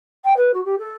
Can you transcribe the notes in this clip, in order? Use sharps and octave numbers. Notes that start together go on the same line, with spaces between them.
G5
B4
F#4
G4
A4